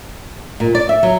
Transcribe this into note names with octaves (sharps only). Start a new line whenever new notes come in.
A#2
D5
E5
F#3